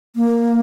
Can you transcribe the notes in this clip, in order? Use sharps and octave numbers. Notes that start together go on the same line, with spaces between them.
A#3